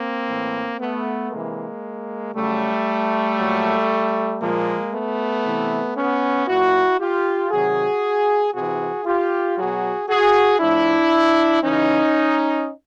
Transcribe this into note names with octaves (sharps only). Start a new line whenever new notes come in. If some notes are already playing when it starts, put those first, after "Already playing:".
Already playing: A#3 C4
A2 E3
A3 B3
C3 E3 G#3 A#3
C#3 F#3 G3 A3
A#2 F#3
A#2 F3 G#3 A#3
A3 B3
C3 E3
B3 C#4
A#2 F#3 E4 F#4
F4 G4
C3 D#3 F#3 F#4 G#4
C3 E3 F#4 G#4
F4 G4
B2 F#3 F#4 G#4
F#4 G#4
A2 F3 D4 E4
C#3 E3 C#4 D#4